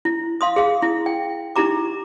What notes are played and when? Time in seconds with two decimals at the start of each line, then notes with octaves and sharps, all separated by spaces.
0.05 E4
0.41 F5 C6 D#6
0.56 G#4 F5
0.82 E4
1.06 G5
1.56 D#4 E4 G4 A#5 D6